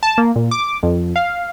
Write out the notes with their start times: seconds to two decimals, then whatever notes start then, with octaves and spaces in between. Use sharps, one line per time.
0.03 A5
0.18 A#3
0.36 A#2
0.51 D6
0.83 F2
1.16 F5